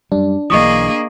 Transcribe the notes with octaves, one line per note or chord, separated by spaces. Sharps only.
F#2 G3 D4
B1 E3 A#3 G#4 D#5 C#6 D#6